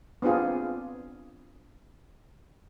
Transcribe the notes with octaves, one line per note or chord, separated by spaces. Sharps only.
B3 C4 D4 F4 G#4